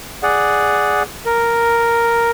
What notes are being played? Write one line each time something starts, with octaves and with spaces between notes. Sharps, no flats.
G#4 D5 F#5
A#4